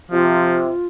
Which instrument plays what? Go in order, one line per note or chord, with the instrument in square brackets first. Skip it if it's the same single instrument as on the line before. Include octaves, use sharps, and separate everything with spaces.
[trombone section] C3 [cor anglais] F3 [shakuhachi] F4